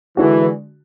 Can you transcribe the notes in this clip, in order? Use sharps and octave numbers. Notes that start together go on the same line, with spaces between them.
D3 E3 G#3 D4 F#4